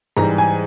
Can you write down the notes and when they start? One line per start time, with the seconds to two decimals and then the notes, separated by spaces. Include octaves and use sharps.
0.17 G#2 E3 G3 A#5
0.38 G#5